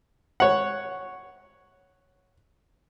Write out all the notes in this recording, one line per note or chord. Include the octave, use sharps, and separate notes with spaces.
C#5 F#5